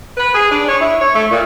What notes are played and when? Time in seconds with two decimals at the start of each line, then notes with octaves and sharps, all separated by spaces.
0.17 B4
0.35 G#4
0.51 D4
0.69 C#5
0.80 E4
1.01 C#5
1.14 A3
1.30 A#2